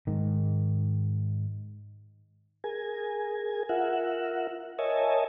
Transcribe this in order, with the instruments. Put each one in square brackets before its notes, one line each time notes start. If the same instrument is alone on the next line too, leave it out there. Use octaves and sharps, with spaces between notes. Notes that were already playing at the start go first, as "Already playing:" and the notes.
[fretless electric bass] G#2 D#3
[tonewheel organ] G#4 A#4 G#5
F4 A#4 E5 F#5
A#4 C#5 D#5 E5 G#5 A5